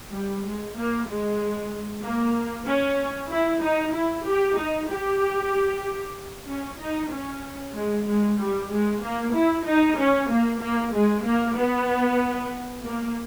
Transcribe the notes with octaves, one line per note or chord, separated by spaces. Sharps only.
G3
G#3
A#3
G#3
A#3
C#4
E4
D#4
E4
G4
D#4
G4
C#4
D#4
C#4
G#3
G#3
G3
G#3
A#3
E4
D#4
C#4
A#3
A#3
G#3
A#3
B3
A#3